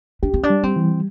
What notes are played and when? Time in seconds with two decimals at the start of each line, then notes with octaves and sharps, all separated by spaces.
0.23 D4 G4
0.34 C4
0.43 D4
0.50 G3
0.63 C4
0.76 E3